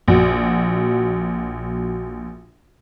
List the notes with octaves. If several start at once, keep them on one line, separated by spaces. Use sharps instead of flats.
A#1 F#4